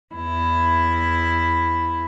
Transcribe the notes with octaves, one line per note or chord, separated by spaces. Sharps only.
E2 E4